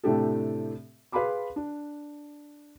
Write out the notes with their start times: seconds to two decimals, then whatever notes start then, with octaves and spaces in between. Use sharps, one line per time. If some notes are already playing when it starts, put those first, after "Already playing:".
0.04 A2 C3 A3 D4 G4 A4
1.12 G#4 B4 F5 B5 C6 D6
1.56 D4